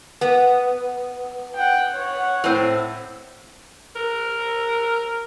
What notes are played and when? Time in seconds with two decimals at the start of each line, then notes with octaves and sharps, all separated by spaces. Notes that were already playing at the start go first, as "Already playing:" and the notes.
0.21 B3
1.55 F#5 G5
1.94 C#5 F#5
2.44 A2 C4
3.96 A#4